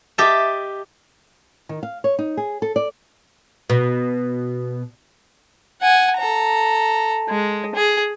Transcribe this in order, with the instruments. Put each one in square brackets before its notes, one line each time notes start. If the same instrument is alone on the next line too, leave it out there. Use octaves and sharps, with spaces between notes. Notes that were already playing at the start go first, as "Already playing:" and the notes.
[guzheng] G4 D#5 E5 A5
[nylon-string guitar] D#3
F5
C#5
D#4
G#4
A4
D5
[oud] B2
[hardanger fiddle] F#5 G#5
A4 A#5
G#3
G#4